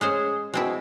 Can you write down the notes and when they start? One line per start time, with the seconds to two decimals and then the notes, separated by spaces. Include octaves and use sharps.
0.01 G#3 C#4 G#4 C5
0.54 B2 G#3 C4 E4